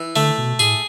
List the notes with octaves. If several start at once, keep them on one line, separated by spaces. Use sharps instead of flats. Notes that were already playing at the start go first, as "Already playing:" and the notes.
Already playing: E3
D3 A3
B2
A2 G#4